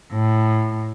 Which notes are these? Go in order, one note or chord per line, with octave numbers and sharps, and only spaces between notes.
A2